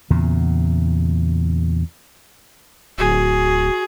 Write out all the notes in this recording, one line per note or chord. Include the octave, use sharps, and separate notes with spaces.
E2 A#2 C#3
D1 F#4 G#4